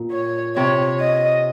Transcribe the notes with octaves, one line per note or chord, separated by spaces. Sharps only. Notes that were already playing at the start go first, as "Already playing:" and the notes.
Already playing: A#2
C#5
C3 C#5
D#5